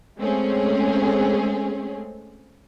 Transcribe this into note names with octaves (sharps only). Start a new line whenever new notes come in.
G#3 A3 C4 C#4 G#4